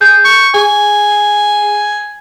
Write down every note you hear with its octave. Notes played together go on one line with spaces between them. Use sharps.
G#4 G6
C#6
G#4 G#5